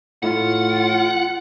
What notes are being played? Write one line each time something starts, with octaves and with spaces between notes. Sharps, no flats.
A2 F4 F#5